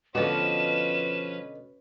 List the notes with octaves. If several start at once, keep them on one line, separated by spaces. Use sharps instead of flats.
B2 D3 F3 C#4 F#4 B4 E7